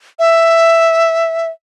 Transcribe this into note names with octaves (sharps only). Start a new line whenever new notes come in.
E5